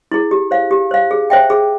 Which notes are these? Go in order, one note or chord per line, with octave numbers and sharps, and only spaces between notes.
E4 G#4
G4
C5 F5
G4
C5 F5
G#4
C5 E5 G5
G#4